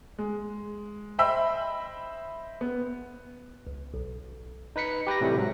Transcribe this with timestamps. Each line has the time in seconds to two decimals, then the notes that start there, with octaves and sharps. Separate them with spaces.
0.18 G#3
1.19 C5 D#5 E5 G5 B5 E6
2.61 B3
3.67 C#2
3.94 B1
4.76 D#4 B4 B6 C#7
5.07 G4 B4 G5 A#6
5.21 A2 C3 E3 G3 A3
5.36 G#2 F#3